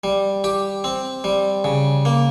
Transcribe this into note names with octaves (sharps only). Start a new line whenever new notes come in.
G3
G4
C4
G3
C#3
A#3